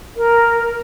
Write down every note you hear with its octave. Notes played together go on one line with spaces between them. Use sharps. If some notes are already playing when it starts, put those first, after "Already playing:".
A#4